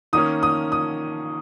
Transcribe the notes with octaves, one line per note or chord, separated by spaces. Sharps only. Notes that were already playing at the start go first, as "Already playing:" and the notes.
D#3 A#3 C#4 D#6
D#6
D#6